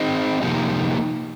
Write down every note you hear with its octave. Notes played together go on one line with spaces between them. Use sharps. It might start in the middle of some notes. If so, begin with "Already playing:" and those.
Already playing: C4 D#4 G#4 C5 D#5
C3 F3 A#3 D#4 G4